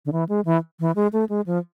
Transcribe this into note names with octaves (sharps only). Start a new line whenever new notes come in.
D3
E3
G#3
E3
E3
G#3
A3
G#3
F3